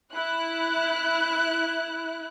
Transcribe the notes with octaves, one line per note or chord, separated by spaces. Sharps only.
E4 F#6